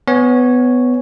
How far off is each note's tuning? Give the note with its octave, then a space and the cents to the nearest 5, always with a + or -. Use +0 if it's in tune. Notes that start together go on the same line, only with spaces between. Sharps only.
B3 +15 C#5 +0 G#5 +0